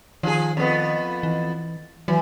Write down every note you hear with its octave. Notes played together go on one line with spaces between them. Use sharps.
D#3 F3 G#4
F2 B3
E3
E3 F#3